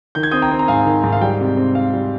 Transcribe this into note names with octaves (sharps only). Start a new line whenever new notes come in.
D#3 G6
G#6
C4 D#6 G6
G5 A#5
C4
A#5
G#2 F5 G#5
D#3
G#2
F5
G3 G5
C3
C4
C4 F5
G3